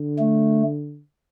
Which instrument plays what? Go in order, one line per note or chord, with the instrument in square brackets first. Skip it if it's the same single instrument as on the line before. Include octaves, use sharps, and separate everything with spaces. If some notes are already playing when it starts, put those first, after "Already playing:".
Already playing: [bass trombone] D3
[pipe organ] A3